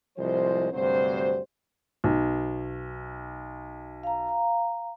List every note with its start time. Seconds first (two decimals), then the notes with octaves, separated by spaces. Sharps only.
0.17 C2 A2 F3 G#3 C5
0.72 D2 G2 C3 F#3 C5
2.04 B1
4.03 F5 A#5